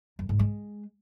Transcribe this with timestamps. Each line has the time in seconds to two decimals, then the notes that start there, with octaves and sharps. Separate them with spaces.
0.19 F#2
0.29 G#2
0.39 G#3